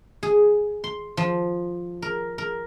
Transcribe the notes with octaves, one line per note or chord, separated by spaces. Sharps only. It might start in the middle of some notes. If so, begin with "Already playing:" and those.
G#4
C6
F3
A#4
A#4